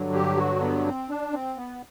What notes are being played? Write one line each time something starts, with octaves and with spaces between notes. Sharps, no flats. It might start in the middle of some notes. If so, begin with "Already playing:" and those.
Already playing: G2 D3 F#3
G4
F#4
B3
C4
D4
C4
B3